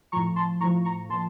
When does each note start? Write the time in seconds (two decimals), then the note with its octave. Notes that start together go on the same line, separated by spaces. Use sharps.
0.12 A2 F3 A#5 C#6
0.36 A5 C6
0.60 A2 A#5 C#6
0.63 F3
0.85 A#5 C#6
1.09 A#2 F3 A5 C6